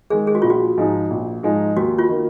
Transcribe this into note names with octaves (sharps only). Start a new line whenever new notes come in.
D#3 G#3 G#4
G#4
F#4
A#1 F4
F#4
G#2 F3 G#3 D#4
A#1
G#2 F3 G#3 D#4
D#2 F#4
F4
D#3 A#3